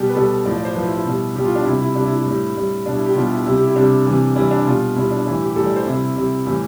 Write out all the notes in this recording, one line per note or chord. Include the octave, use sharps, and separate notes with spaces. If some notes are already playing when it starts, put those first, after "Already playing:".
Already playing: B2 G3 G4
B4
B2 G3 A4
A2 F3 D5
D5
C5
A2 F3 B4
E4
E4
B2 G3
B2 G3 G4
F4
D4
C3 G3 E4
E4
C3 G3 D4
E4
E4
A2 G3
A2 G3
B2 G3 D4
E4
G4
B2 G3 F4
E4
C3 G3 E4
G4
E4
C3 G3 D4
C3 E3 G3
C3 E3 G3 E4
D4
B2 G3 F4
B2 G3 E4
D4
A2 E3 G3 E4
G4
A2 E3 G3 A4
D5
C5
C3 G3 E4
C3 G3
A2 E3 G3 E4